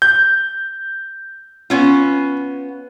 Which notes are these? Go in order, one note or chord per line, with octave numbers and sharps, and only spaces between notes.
G6
B3 C#4 F4